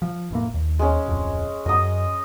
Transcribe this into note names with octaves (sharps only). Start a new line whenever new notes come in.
F3
F1 A2 A#3
D#2
G#3 C#4
D1 F2
F#2 D#5 D#6